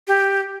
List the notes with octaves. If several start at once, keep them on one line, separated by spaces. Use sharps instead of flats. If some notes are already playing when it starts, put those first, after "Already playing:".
G4